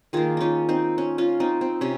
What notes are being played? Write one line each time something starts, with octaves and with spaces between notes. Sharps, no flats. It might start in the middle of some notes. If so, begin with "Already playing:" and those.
D#3 A#3 F4 G#4
C#4 D#4 F4
C4 D#4
C#4
C#4 F4
C4 D#4
C4
C3 C#4